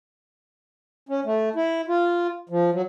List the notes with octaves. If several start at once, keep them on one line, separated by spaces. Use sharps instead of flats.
C#4
A3
E4
F4
F3
F#3